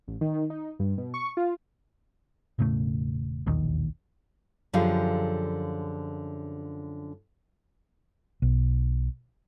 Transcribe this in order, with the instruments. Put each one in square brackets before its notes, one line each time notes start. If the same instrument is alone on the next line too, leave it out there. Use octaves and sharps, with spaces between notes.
[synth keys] A1
D#3
D#4
G2
B2
C#6
F4
[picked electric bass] E1 A2 C#3 A3
E1 A#1 D#2 D#3
[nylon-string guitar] F#2 D3 F3 G4 G#4 F5
[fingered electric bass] B1